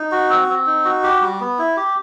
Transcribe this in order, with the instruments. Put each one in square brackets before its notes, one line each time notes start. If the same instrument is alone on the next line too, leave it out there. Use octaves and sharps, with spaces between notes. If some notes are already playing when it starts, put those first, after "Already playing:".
Already playing: [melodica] D#4
F#4
C4
C4
D#4
F#4
G4
G3
B3
E4
G4